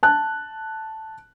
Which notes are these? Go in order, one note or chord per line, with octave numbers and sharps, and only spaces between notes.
A5 F#6